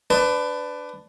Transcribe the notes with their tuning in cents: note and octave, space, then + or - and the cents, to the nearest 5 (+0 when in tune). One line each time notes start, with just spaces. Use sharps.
D4 +0 B4 +25